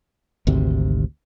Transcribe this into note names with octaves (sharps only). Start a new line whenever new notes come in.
G#1 D2 C3